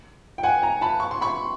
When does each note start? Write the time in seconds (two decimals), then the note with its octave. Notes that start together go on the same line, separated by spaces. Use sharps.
0.38 G5
0.43 F#5 G#5
0.62 G#5 A#5
0.81 A5 B5
1.00 C#6
1.11 C6
1.21 B5 C#6